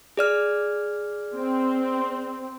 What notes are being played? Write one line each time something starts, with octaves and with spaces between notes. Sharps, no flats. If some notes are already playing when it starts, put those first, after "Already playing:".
G#4 D5 F6
C4